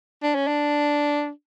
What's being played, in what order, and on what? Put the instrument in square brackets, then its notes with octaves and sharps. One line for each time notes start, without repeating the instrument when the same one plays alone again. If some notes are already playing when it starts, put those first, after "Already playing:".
[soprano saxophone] D4
C#4
D4